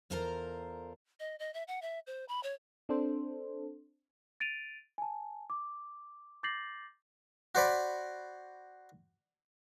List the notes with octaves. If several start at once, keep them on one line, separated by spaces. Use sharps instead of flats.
E2 F4 A4 A#4 C5 A#5
D#5
D#5
E5
F#5
E5
C5
B5
C#5
C4 D4 A4 C5
A6 D7 D#7 F7
G#5 A5
D6
D6 G6 A6 A#6 C7 F#7
F#4 C5 D5 B5